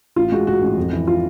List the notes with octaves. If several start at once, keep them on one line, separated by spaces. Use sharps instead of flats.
A1 F4
G#3 F#4
G#2 F#4
A1
F2
E3
F4